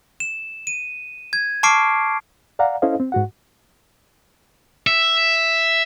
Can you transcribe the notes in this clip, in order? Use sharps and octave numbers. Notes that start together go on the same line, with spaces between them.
E7
D#7
G#6
A5 C#6 D6 F6 C7 D7
D5 F5 F#5 A#5
C#4 E4 A4 C5 D#5 F5
C4
G#2 F#4 F#5
E5